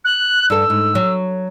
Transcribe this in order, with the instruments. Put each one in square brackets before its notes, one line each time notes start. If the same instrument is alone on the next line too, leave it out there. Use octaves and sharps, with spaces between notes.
[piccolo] F#6
[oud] G2 A4 [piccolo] E6
[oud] G#2
F#3